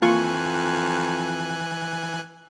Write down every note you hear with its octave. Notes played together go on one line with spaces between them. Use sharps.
F2 E3 A#3 F4 G#5 C#6 F#6